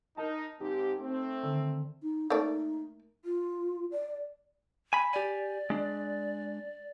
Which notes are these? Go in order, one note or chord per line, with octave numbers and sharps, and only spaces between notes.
D#4 A#4 A5
G#2 C4 D#4 G4
A3 C4
D3 D#3 A4
D#4
A3 A#3 D#4 D5
F4
D5
G#5 B5
G4 D5 G#5
G#3 D4